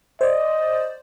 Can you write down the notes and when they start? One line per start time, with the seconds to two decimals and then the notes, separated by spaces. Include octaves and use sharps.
0.21 C5 D5 D#5